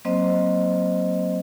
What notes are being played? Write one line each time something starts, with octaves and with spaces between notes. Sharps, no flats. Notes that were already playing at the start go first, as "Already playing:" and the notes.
F#3 A#3 C4 C5 D#5